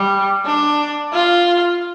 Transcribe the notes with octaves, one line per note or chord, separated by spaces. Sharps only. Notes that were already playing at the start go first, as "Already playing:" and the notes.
Already playing: G3
D4
F4